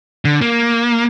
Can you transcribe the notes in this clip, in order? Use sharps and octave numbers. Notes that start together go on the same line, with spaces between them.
D3
A#3